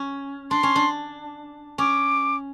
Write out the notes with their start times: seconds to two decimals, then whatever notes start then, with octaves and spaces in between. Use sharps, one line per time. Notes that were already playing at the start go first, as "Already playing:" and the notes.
Already playing: C#4
0.51 D4 C6
0.63 C#4
0.76 D4
1.78 C#4 D6